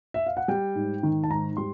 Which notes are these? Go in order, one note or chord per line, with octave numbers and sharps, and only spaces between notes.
E5
F5
F#5
G3 G5
G#2
D#3
A5
G#2 A#5
G3 C6